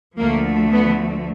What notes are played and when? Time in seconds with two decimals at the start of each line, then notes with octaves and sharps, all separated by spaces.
0.19 D2 D3 F3 A3 A#3
0.72 B3